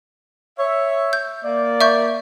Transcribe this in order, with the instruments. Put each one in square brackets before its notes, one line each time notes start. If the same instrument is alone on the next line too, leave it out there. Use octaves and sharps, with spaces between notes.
[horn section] C#5 E5
[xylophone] G6
[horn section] A#3 D5
[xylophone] E5 C#6 G6